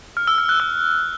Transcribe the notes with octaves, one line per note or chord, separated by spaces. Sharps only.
F6
E6
F6
F#6
E6